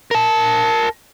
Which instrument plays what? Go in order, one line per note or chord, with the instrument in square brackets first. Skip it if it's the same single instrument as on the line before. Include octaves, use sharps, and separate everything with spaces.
[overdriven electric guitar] A#4 A5